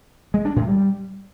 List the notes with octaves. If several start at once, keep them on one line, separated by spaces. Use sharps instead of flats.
G#3
D4
A2
G3